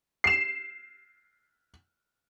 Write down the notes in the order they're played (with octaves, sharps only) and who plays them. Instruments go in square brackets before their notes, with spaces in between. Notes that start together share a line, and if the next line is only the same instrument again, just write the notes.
[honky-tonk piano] C7 E7